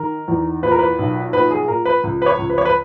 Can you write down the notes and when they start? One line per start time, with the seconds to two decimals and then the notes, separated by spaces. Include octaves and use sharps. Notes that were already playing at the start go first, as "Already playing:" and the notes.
Already playing: D#3 A#4
0.28 E2
0.63 A#2 B4
0.71 A#4
0.79 B4
0.99 B1
1.33 A#2 B4
1.51 G#4
1.68 A#2 A#4
1.85 B4
2.04 C#2
2.22 B4
2.26 C#5
2.39 C#2
2.50 B4
2.58 C#5
2.65 B4